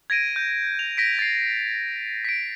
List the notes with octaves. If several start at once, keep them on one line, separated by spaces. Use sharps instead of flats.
G#6 A#6 D7 D#7
G6
F7
A#6 B6 D7
A6 C7
B6 D7